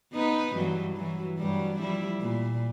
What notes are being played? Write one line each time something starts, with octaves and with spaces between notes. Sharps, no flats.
B3 D#4 B4
G2 E3 F#3
E3 F#3
G2 F#3 G3
F3 G3 E4
A#2